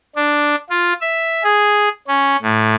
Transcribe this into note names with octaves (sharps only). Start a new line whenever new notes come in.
D4
F4
E5
G#4
C#4
A2